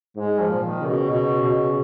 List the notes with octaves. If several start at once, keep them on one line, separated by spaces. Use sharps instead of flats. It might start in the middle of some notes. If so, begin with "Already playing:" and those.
G#2 G#3
F3
A#2
D#3
C#3
B2
B2
B2